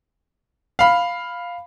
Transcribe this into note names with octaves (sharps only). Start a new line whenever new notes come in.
F5 B5